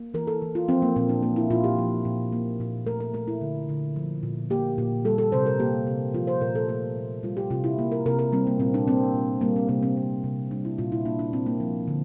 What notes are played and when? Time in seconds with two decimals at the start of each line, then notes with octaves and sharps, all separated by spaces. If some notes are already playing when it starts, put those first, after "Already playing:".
Already playing: A#3
0.14 E3 A#4
0.27 A4
0.42 E3
0.55 F4
0.69 F3 C4
0.82 A#3
0.96 A#2 C4
1.09 D4
1.23 A#3
1.36 E4
1.50 A#2 F4
1.64 G4
1.78 F3
2.05 A#2
2.32 A#3
2.60 A#2
2.86 A3 A#4
3.00 A#4
3.14 A3 A#4
3.27 E4
3.41 D3
3.69 D3
3.96 F3
4.23 A#2
4.50 A#3 G4
4.78 A#2
5.05 G3 A4
5.18 A4
5.32 C3 C5
5.46 A#4
5.60 A#3 G4
5.87 C3
6.14 F3 F4
6.27 C5
6.41 A#2 A#4
6.55 A4
6.69 A3 A4
6.96 A#2
7.23 G3 F4
7.37 G4
7.50 C3 F4
7.64 E4
7.79 A#3
7.92 A#4
8.06 C3 A#4
8.19 A#4
8.32 G3 C4
8.47 A#3
8.60 A#2 C4
8.74 D4
8.88 A#3 C4
9.14 A#2
9.41 G3 A#3
9.56 C4
9.69 C3 A#3
9.83 C4
9.97 A#3
10.24 C3
10.51 G3 D4
10.65 E4
10.78 A#2 F4
10.92 E4
11.05 A#3 D4
11.19 D4
11.33 A#2 C4
11.46 A#3
11.60 F3
11.88 D3